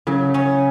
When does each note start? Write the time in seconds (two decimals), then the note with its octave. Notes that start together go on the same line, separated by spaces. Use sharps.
0.07 C#3 F#3
0.34 C#4